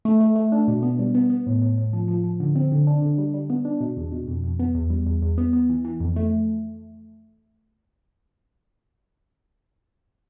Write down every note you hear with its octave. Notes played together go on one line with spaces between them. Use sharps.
A3
A3
A3
D4
B2
B3
G3
B3
B3
A2
A2
A2
F3
F3
F3
D3
C4
D3
D4
D3
G3
G3
B3
D4
B2
E2
B2
F2
F2
B3
E2
G3
E2
E2
B3
B3
E3
E3
F2
A3